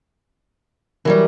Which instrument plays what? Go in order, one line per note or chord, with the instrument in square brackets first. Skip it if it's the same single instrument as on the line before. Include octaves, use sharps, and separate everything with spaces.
[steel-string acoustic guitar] E3 F#3 G3 [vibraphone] A#4